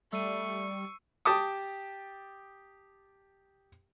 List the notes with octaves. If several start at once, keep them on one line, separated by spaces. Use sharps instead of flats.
G3 A3 C#6 E6 C7 D#7
G4 A5 D6 D#6